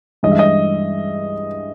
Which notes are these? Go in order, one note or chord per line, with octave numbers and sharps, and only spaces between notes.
G2 E3 G#3 D#5
E5
D#5